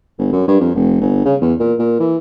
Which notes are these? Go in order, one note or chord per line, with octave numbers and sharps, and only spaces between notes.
G1
F#2
G2
F2
F1
G1
C#3
E2
A#2
A#2
E3